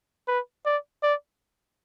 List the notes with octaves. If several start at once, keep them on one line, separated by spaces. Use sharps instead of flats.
B4
D5
D5